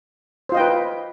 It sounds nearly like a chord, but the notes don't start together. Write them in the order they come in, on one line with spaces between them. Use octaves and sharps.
C5 F4 D#5 G5 B4